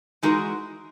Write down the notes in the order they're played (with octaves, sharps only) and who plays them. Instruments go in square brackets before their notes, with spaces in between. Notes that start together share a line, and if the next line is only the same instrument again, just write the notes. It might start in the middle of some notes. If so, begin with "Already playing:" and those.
[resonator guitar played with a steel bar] E3 G#3 D#4 F#4 A#4